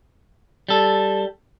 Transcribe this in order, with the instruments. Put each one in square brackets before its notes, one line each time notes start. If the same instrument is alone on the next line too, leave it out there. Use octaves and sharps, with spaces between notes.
[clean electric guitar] G3 A4